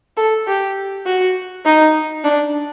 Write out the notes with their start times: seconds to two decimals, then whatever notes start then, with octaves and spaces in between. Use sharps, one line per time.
0.17 A4
0.47 G4
1.06 F#4
1.65 D#4
2.24 D4